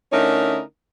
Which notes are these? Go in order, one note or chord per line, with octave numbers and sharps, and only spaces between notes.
D3 A3 C#4 D#4 E4 A#4